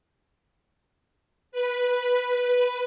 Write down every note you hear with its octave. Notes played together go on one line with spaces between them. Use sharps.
B4